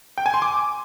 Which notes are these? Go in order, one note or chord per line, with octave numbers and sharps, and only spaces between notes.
G5
G#5
C6
D6